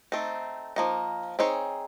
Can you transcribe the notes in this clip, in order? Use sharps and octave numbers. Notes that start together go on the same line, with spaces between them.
A3 C4 D#4
F3 A#3 D#4
C4 D#4 G#4 C#5